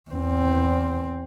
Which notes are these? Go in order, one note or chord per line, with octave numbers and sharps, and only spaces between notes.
E2 C4